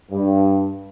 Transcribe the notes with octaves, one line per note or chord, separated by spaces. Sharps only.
G2